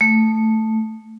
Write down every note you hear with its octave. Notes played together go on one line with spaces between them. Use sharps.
A3